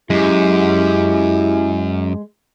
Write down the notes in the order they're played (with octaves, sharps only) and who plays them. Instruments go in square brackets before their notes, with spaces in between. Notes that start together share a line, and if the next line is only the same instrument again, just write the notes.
[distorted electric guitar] F#2 [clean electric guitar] G#3 [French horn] E4 [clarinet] G4